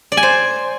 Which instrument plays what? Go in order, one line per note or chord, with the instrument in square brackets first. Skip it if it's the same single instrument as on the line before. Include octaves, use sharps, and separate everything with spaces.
[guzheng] D5
G#5
C5